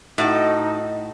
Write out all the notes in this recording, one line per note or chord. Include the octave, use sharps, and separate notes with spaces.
A2 D#4 F#4 A4 D#5